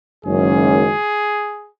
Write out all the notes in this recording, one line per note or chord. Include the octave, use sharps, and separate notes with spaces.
F#1 F#2 D#3 G#3 C#4 G#4